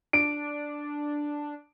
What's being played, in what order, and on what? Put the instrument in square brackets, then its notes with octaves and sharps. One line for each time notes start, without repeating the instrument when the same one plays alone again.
[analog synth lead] D4 [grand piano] D7